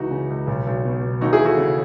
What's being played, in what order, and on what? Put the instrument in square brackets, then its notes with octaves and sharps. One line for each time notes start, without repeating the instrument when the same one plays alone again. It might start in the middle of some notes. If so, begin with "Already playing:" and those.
Already playing: [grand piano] C#2 E3 D#4 F#4
C#3
C#2
B1
B1
B2
B2
D#2 D#4 F#4
E4 G#4
E3
F#4 A4
C#3